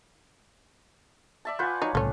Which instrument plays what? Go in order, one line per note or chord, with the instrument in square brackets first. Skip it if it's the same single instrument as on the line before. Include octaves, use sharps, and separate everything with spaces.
[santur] D5 E5 A5
[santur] F4 B4 F#5 [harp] G#5 G6
[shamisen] F#3 D#4 [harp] C#5
[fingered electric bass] C2 A2 C#3 [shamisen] A3 C#4